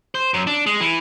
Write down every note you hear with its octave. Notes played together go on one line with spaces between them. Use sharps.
C5
F#2
D4
G#3
E3